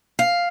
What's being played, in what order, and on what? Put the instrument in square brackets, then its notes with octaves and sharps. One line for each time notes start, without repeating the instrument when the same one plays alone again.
[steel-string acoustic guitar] F5